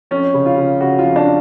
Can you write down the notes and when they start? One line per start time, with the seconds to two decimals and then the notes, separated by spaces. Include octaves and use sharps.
0.11 F2 C#4
0.34 C#3
0.46 F4
0.57 C#3
0.81 C#3 F#4
0.99 F4
1.04 F2
1.16 D4